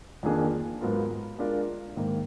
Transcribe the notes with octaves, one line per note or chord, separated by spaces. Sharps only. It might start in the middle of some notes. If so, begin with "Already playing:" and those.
F2 D#3 A#3 D4 G#4
G#2 F#3 B3 F4 A#4
G#3 D4 F4 A#4 D5
G#2 D#3 A#3